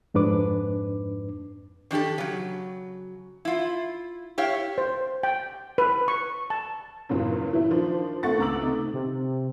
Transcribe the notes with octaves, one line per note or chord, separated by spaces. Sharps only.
F2 G#2 D4 B4 D6
D#3 D4 F4 G4 A4
C#3 F#3
E4 F4
E4 G4 C#5 F5
C5
G5
B4
C#6
A5
E2 G2 A#2 C#3 F#3
E3 E4
D#3 F3 D4 C5
D#3 A3 F#5 C#6 A6
C#2 F#5 A#5 D6 E6 F#7
C3 A3 D#4
C3